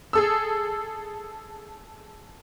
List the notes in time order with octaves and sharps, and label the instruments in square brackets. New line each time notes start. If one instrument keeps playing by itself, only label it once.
[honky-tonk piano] G#4 A4 E6